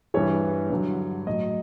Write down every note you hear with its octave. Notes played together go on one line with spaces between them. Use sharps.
G2 E3 C#5
G2 D3 F#3
A2 F#3 D#5